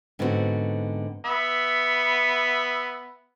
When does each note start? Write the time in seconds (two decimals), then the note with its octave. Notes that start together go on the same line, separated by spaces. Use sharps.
0.19 G#2 D3 B3 C4 E4 F#4
1.25 B3 E5 B5